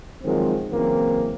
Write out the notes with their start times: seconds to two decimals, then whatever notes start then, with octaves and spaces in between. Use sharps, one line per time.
0.24 D#3 F3 F#3 G#3 C4
0.71 C#3 E3 F#3 A#3 C4